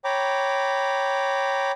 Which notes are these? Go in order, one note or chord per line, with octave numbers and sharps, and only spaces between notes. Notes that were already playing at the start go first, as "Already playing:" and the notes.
C#5 G5 A#5 B5 D6